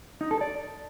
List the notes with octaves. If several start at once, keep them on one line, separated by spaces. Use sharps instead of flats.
D#4
A4
D5